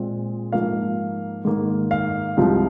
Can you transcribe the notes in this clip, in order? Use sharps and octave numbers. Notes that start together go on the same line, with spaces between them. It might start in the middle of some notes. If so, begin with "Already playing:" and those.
Already playing: A#2 G#3 C4
G#2 F3 A#3 F5
G#2 D#3 A#3
F5
C2 C3 F3 G#3